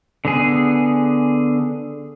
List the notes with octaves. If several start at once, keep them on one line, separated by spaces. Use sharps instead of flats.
D3 B3 G#4